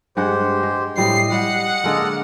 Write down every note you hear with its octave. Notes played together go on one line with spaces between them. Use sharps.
G2 G#3 G4 C5 F#5
G#3
A2 G3 G4 D#5 C7
G3 F#5
D3 G#3 A#3 A4 D#5 F6